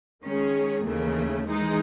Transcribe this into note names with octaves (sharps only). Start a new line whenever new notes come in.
D#3 G#3 C#4 G#4
D#2 C#3 E3 A3
E3 G#3 D#4